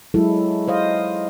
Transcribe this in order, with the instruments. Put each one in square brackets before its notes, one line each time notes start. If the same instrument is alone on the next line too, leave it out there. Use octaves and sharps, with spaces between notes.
[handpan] F#3 G#3 E4 A4
C5 D#5 F5